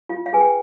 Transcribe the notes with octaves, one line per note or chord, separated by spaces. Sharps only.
F4 F5
F5
G#4 B4 G#5
G5